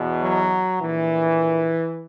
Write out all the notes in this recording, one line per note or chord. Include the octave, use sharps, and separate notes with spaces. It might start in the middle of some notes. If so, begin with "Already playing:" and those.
Already playing: E2 B2
F#3
A#1 A#2 E3